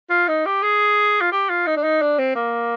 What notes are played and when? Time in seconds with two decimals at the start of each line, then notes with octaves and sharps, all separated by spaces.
0.10 F4
0.28 D#4
0.46 G4
0.63 G#4
1.21 F4
1.32 G4
1.49 F4
1.67 D#4
1.77 D4
1.84 D#4
2.01 D4
2.19 C4
2.35 A#3